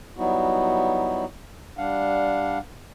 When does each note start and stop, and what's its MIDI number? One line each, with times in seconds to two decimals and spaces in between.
0.17 1.25 54
0.17 1.25 55
0.17 1.25 59
0.17 1.25 63
0.17 1.25 64
0.17 1.25 66
1.78 2.58 55
1.78 2.58 62
1.78 2.58 77
1.78 2.58 78